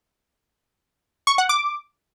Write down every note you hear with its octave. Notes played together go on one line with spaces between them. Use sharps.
C#6
F#5
D6